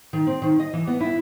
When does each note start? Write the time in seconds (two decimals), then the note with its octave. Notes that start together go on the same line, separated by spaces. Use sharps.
0.13 D#3
0.27 C4
0.42 D#3
0.59 D#5
0.73 E3
0.87 B3
1.00 E4